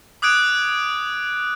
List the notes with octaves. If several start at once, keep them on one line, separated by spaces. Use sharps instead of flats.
D6 D#6 F#6 G#6 D7